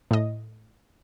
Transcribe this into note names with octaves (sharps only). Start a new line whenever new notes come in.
A2 D#5